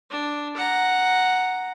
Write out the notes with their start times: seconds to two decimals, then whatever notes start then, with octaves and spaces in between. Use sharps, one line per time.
0.11 D4
0.57 F#5 A#5